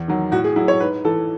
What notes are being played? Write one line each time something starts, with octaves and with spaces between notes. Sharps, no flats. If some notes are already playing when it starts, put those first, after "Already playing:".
Already playing: E2
D#3 F#3
A2 F#4
G#4
F#3 E4
C#5
G#2 B4
E3 A4